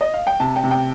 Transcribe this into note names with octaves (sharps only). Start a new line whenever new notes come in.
D#5
F5
G5
C3 A5
G5
C3
G5